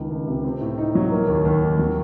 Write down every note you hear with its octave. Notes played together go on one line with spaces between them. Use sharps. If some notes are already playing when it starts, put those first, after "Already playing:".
Already playing: C#2 D#3
C#2
C3
C4
A2
D#4
F#3
A#3
D#2
D#2
D#3
F#3